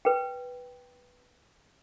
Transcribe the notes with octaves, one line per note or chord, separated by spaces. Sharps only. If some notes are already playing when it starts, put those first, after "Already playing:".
B4 G5